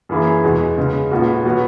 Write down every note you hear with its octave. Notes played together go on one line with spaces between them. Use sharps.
F#2 E3 A#3 E4 G#4
E2 B2 G#3
C#3 G#3 B3
B1 A#2 G#3 B3 F#4
B2 F#3 B3 F#4